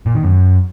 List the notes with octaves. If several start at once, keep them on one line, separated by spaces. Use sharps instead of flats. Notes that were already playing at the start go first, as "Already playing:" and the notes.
A#2
D#3
F#2